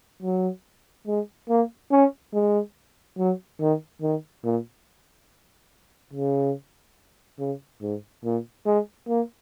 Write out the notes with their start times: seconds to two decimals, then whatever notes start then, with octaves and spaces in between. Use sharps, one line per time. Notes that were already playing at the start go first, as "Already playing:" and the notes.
0.23 F#3
1.07 G#3
1.49 A#3
1.92 C#4
2.34 G#3
3.18 F#3
3.61 D#3
4.02 D#3
4.44 A#2
6.13 C#3
7.39 C#3
7.82 G#2
8.25 A#2
8.66 G#3
9.08 A#3